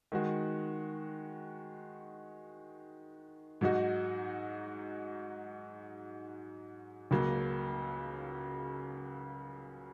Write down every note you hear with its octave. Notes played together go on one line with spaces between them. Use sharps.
D#3 G#3 F#4
G#2 F#3 D#4 F#4
C#2 C#3 F#3 A#3